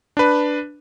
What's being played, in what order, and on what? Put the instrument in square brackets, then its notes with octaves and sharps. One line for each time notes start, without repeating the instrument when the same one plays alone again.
[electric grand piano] D4 B4